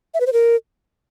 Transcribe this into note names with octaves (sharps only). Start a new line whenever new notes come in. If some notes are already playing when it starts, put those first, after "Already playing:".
E5
B4
C5
A#4